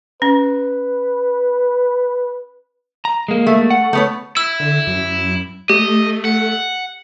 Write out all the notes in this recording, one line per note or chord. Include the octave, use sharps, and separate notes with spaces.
C#4 B4
A#5
G#3 A#3
A3
F#5
A3 B3 C#5
E4 E6
D3
F#2
A3 G4 D#5
F#5